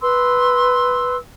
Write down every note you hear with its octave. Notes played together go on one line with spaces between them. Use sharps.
B4 C6 E6